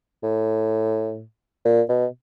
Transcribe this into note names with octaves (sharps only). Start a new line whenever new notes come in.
A2
A#2
B2